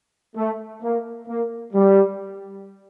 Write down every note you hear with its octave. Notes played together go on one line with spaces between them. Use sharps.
A3
A#3
A#3
G3